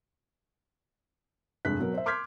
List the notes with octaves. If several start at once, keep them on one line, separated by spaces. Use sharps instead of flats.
F1 G2 G#3 F#6 B6
B2 F#3 A#4
C5 E5
C6 D6 F6 G6 G#6 B6